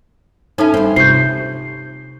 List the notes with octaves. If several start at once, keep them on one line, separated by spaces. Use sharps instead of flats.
C#4 D#4 E4 A4 A5
G2 F#3 C4
C3 C4 F4 G4 C5 G6 C7